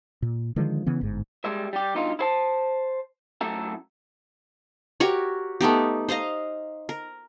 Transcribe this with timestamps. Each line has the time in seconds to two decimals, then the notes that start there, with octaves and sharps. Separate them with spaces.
0.22 A#2
0.56 D3 D#3 F3 G#3
0.86 C#3 E3 B3
1.01 G1 G#2
1.45 G3 G#3 E5
1.73 G3 G4
1.95 G2 B2 D#4 F4
2.19 E4 C5 A5
3.41 F#2 A2 A3 A4 E5 A#5
5.00 F#4 G4 A#4 C#5
5.61 A3 B3 D#4 G4
6.09 C5 D#5 F5 A#5
6.89 A#4